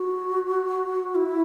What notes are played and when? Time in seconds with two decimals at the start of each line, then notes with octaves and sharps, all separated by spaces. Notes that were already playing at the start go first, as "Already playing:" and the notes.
Already playing: F#4
1.15 E4